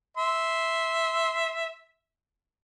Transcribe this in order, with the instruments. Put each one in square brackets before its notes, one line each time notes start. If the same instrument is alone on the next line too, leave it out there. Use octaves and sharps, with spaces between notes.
[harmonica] E5 C6